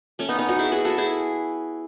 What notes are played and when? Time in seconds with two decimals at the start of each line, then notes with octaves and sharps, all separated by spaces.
0.19 A3 C#4
0.29 B3 D#4
0.39 B3 D#4
0.49 D#4 F#4
0.59 E4 G#4
0.72 G#4 B4
0.85 F#4 A4
0.98 E4 G#4